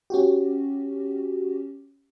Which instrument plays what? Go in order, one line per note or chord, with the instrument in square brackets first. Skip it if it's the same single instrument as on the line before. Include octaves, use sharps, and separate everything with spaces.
[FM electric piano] C#4 F#4 G4